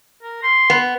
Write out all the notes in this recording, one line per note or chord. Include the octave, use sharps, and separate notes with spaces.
A#4
C6
B3